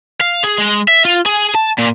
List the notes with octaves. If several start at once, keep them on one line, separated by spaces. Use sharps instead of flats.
F5
G#4
G#3
E5
F4
G#4
A5
A#2